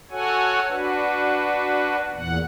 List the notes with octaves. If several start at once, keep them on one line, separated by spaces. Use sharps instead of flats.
F#4 A4 C#5 F#5 G#5
D4 F#4 B4
E2 A#2 F#5